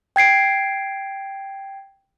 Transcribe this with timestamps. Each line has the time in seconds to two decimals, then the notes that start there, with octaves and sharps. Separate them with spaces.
0.16 G5 G#6 C7 D7